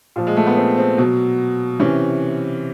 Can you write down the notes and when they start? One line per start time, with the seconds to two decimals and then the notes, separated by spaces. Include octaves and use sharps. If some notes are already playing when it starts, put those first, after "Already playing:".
0.16 A#2 F3
0.27 G#3
0.37 A3
0.47 B3
0.57 C4
0.78 C4
0.98 B2 F#3
1.80 C3 E3 C#4